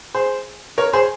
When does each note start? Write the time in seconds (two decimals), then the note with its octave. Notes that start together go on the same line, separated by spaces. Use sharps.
0.15 G#4 C5
0.78 A#4 C#5
0.93 G#4 C5